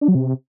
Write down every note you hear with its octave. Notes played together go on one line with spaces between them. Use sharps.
D4
F#3
C3